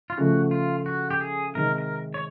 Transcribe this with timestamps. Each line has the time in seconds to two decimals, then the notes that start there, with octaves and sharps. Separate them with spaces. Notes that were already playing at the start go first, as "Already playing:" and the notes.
0.10 F4
0.17 C#3 F3 A3 F#4
0.51 F4
0.86 F#4
1.11 G4
1.21 G#4
1.55 C3 D#3 G#3 A#4
1.78 A#4
2.14 C#5